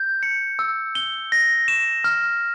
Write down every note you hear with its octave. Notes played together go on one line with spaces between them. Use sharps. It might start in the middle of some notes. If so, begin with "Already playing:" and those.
Already playing: G6
C#7
E6
G7
A#6
E7
F6